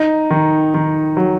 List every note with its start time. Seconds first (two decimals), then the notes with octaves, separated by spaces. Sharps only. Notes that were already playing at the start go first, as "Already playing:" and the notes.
Already playing: D#4
0.30 D#3
0.74 D#3
1.17 F#3